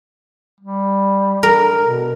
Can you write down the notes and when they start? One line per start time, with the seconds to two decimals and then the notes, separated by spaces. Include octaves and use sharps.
0.60 G3
1.43 A#4
1.83 B2